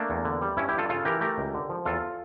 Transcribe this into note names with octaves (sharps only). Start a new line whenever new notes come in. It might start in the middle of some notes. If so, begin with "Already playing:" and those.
Already playing: A3 A#3 D4
E2
D3
G3
G2 C#4 E4
E4 G4
G2 F4 A4
C#3 F4 A4
E3 G4 A#4
A3 G4 A#4
C#2
D3
F3
E2 F4 A4